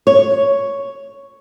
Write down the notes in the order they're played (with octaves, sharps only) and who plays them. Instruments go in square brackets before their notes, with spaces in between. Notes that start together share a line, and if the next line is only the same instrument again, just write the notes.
[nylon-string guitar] C#5